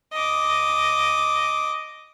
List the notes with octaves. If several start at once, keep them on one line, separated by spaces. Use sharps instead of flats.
D#5 D6